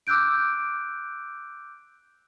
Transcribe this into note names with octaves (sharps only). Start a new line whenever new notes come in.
D6 E6 F#6 G6 D7